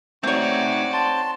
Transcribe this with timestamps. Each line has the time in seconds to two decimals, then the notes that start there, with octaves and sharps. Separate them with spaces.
0.23 A3 C4 D#4 F#4 C#5 D5
0.93 A5 C6